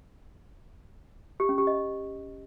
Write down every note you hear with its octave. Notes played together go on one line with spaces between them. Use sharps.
G4
C#4
G4
D#5